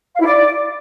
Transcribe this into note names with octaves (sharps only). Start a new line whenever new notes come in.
F5
E4
D5